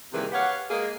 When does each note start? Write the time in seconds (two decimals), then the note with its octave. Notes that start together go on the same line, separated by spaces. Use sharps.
0.13 C3 D#3 E3 G3 A#3 G#4
0.32 G4 B4 C#5 F5 F#5
0.70 G#3 A#3 G#4